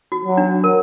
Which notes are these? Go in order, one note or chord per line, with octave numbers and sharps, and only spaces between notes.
F#4
F#3
D4
A#4